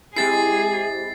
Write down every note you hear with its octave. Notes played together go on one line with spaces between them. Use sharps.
G#3 C4 E4 G4 G#4 A6 C7